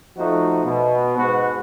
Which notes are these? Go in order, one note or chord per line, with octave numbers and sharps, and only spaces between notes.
F3 A3 D#4 F#4
B2
G#2 B2 G#3 F#4 B4